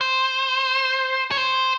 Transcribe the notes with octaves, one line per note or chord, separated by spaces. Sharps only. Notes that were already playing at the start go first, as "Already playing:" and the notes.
C5
C#5
C5